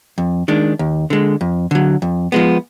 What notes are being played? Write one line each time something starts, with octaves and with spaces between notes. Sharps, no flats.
F2
D#3 G#3 D4
D#2
D3 G#3
F2
D3 F#3
F2
F3 G#3 B3